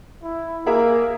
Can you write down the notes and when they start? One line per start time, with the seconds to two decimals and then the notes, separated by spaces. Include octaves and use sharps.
0.23 E4
0.66 A#3 G#4 A#4 E5